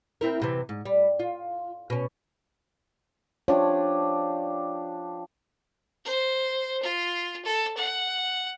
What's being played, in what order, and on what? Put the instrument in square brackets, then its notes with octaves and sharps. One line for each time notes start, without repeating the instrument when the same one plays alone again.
[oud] C4 E4 A#4
F#2 C3 E3
G#2
G3
F4
B2 C#4
[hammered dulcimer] F3 D4 G4 [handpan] C#5
[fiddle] C5
F4
A4
F#5